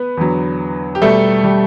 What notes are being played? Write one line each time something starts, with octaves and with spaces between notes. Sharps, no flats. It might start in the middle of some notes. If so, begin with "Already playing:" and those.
Already playing: B3 B4
E2 D3 F#3
G4
B2 G3 A3 A4
G3 G4